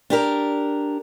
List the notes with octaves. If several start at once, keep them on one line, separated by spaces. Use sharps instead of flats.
D4 G4 A#4